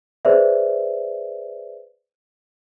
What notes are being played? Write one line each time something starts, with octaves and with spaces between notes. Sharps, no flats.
G#4 B4 C5 D5 E5